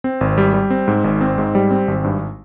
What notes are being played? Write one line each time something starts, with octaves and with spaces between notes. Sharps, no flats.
C4
G#1
G3
G3
C4
G#2
G#1
C4
G#2
G3
C4
G#1
G2